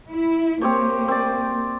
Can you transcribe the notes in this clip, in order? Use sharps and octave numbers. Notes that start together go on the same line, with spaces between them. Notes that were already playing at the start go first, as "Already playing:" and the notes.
E4
A#3 C4 G4 C#5
C4 D5